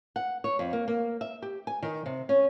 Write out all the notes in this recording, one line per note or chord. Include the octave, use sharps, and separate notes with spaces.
F#5
C#5
F2
A#3
A#3
E5
G4
G#5
D#3
C3
C#4